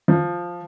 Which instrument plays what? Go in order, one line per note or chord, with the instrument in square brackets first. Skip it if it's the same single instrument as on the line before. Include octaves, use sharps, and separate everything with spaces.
[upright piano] F3